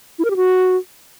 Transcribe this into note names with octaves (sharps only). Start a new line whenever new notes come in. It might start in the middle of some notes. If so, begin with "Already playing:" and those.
E4
A#4
G4
F#4